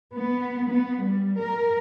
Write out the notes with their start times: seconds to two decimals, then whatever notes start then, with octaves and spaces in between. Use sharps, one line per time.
0.14 B3
0.69 B3
1.02 G3
1.39 A#4